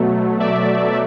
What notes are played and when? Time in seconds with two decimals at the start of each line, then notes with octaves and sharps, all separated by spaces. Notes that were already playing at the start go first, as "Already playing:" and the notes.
Already playing: B2 F#3 A3
0.40 D5 E5